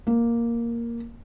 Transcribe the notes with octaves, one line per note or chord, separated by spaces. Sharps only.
A#3